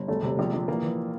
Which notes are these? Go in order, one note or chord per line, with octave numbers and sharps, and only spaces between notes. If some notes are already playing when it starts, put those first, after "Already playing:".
Already playing: G1
E1 A3
C3
A#1
A#1
E3 A#3
E3